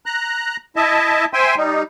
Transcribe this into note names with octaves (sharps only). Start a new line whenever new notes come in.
A#5 F#6
E4 D#5 E5 A5
C5 E5 G5 G#5 C6
G3 D#4